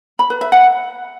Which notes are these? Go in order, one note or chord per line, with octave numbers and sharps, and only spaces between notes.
B5
B4
E5
F#5